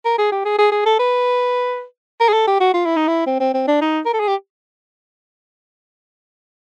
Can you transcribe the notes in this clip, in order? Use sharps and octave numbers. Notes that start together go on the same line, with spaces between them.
A#4
G#4
G4
G#4
G#4
G#4
A4
B4
A#4
G#4
A4
G4
F#4
F4
E4
D#4
E4
C4
C4
C4
D4
D#4
A#4
A4
G#4
G4